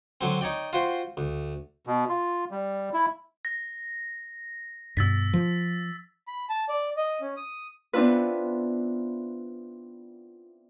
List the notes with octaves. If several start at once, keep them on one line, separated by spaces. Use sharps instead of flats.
D3 F#3 C4
D#4 C#5 D5 G5
F4 F#4 C5 G5
D2
B2
F4
G3
E4
A#6
G2 B2 E6 A6 B6
F3
B5
A5
D5
D#5
C#4
D#6
B3 C4 D4 E4 F4 B4